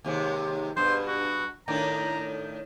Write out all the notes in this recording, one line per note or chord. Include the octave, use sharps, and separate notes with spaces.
D#2 C3 G#3
G2 B2 C5
F#4
A2 D#3 D4 A#5